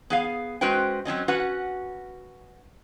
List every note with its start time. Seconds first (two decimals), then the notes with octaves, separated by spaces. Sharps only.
0.10 B3 G#4 F5
0.61 G#3 C#4 F#4 B4 C5 G5
1.05 F#3 C4 C#4 D#5
1.28 C#4 F#4 B4 F#5